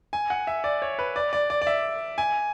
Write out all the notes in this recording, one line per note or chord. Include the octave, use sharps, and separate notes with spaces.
G#5
F#5
E5
D5
C#5
B4
D5
D5
D5
D5
E5
G#5